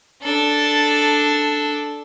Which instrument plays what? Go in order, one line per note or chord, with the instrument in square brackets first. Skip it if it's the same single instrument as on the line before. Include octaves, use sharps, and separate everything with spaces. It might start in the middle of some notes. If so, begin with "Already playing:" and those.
[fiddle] D4 A4